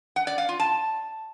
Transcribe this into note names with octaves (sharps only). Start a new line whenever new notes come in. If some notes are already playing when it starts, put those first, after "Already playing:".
F#5
D5
F5
F4
A5